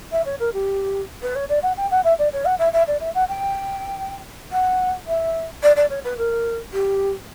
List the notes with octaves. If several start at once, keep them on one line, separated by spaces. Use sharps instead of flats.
E5
C#5
A#4
G4
B4
C#5
D5
F#5
G5
F#5
E5
D5
C#5
F#5
E5
E5
D5
E5
F#5
G5
F#5
E5
D5
D5
C#5
B4
A#4
G4